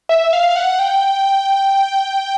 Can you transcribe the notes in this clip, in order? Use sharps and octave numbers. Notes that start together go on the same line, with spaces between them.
E5
F5
F#5
G5